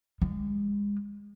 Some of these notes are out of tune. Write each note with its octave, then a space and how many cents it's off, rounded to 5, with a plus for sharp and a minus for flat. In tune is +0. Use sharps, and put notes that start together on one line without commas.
G#3 -30